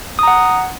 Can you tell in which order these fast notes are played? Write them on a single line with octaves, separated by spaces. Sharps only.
D#6 A#5 F#5